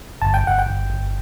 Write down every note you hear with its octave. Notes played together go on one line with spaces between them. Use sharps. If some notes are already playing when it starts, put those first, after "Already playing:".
G1 A5
G5
G1 F#5
G5
G1
G1